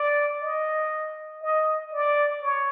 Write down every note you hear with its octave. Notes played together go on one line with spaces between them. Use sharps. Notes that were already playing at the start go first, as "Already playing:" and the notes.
Already playing: D5
D#5
D#5
D5
C#5